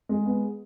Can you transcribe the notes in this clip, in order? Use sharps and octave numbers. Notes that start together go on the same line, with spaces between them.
G#3
B3